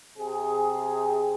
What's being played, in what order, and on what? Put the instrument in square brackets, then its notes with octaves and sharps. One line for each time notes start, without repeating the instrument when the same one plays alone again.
[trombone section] C3 G#4